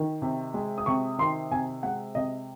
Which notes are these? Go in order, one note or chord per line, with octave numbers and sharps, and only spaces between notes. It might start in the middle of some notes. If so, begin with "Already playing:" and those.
Already playing: D#3
C3
G#3
D#6
C3 C#6
D#3 C6
C3 G#5
G#3 F#5
C3 D#5